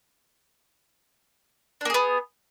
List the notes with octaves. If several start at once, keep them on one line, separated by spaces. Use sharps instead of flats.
A#3 B3 D4 G#4